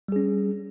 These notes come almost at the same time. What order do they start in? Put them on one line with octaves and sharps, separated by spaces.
G3 G#4 C#4